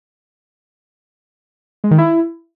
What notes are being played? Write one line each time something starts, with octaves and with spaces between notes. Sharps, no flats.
G#3
D#3
E4